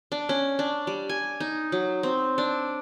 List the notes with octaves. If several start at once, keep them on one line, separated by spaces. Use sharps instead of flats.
D4
C#4
D4
G3
G#5
D#4
F#3
C4
D4